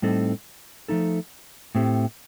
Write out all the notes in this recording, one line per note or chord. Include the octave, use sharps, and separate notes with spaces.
A2 G3 C4 D#4 A4
F3 A3 D#4 A4
A2 A3 C4 G4